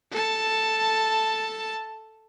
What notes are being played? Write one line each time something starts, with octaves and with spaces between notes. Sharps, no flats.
A4 A5